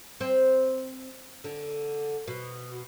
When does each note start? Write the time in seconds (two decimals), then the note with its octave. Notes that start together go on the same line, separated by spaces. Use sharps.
0.21 C4
1.44 D3
2.28 B2